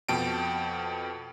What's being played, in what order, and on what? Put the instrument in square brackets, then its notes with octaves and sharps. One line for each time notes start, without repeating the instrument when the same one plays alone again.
[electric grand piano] F2 B2 G5 A5 D7